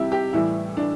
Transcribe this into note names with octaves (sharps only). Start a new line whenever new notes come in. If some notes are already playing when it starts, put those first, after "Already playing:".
Already playing: C3 G3 E4 G4
G4
A2 E3 G3 E4
D4